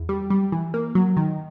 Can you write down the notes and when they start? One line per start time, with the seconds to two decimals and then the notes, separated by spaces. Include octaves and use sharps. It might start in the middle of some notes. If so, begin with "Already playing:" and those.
Already playing: E2
0.09 G3
0.30 G3
0.52 E3
0.74 A#3
0.95 F#3
1.17 D#3